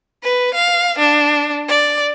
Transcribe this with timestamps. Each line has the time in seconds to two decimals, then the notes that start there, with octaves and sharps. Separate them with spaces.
0.23 B4
0.54 F5
0.99 D4
1.69 D5